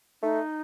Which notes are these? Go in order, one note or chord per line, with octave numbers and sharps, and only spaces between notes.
A3 D#4